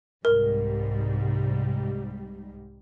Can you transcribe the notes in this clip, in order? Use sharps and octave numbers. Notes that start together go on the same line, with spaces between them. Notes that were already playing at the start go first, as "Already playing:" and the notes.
C2 G#2 G3 A#4